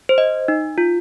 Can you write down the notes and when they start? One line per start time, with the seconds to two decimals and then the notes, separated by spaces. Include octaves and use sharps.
0.09 C5
0.18 D#5
0.48 D#4
0.78 F4